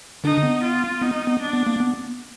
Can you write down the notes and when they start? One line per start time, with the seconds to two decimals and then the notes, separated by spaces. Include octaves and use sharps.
0.24 D3 D4 D#4
0.43 B3
0.64 F4
1.01 B3 D#4
1.27 B3
1.41 D4
1.53 B3
1.67 A#3
1.80 B3